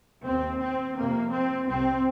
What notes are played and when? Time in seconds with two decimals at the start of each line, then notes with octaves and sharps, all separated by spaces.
0.24 D#2 C4
0.60 C4
0.97 F2 C3 A#3
1.32 C4
1.68 C2 C3 C4